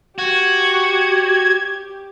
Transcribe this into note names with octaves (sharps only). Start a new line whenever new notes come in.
F#4 G4 G#6